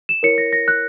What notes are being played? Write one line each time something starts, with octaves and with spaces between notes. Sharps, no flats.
E7
E4 A#4 C#5 C#7
A#6
A#6
F#6